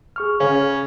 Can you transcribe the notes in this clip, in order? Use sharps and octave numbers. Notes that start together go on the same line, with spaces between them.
G#4 C#6 F6
C#3 C#4